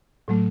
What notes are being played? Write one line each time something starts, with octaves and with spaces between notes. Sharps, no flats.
A2 F#3 A3